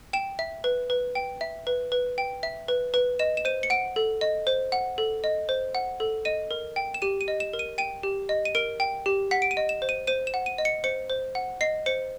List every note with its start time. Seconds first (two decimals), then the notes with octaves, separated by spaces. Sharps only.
0.13 G5 E7
0.39 E5
0.64 B4
0.90 B4
1.15 G5
1.41 E5
1.67 B4
1.92 B4
2.18 G5
2.43 E5
2.68 B4
2.94 B4
3.19 D#5 E7
3.37 E7
3.45 C5 D#7
3.63 C#7
3.70 F#5 D7
3.96 A4
4.21 D#5
4.47 C5
4.72 F#5
4.98 A4
5.24 D#5
5.49 C5
5.75 F#5
6.00 A4
6.25 D#5 D#7
6.51 A#4
6.76 G5
6.94 E7
7.02 G4 D#7
7.21 D#7
7.28 D#5
7.40 E7
7.53 A#4
7.59 D#7
7.78 G5 D#7
8.03 G4
8.29 D#5
8.45 D#7
8.55 A#4 D7
8.80 G5
9.06 G4
9.31 F#5 B6
9.42 D7
9.51 D#7
9.57 D#5
9.69 E7
9.82 C5
9.89 D#7
10.07 C5 D#7
10.27 E7
10.34 F#5
10.46 D#7
10.58 D#5
10.65 C#7
10.84 C5 C#7
11.10 C5
11.35 F#5
11.61 D#5 C7
11.86 C5 C#7